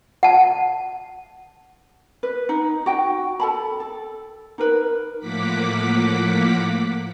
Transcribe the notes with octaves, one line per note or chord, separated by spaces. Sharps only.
F#5 A5
B4
D#4
F#4 G5
A4 A5 B5
A4
D#4 A#4 B4
A2 F3 A#3 F#5 D6 B6